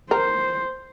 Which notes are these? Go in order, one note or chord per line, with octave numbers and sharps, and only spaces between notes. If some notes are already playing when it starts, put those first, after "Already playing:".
A#4 C5